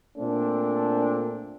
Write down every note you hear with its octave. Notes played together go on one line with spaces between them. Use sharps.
A#2 A3 C4 D4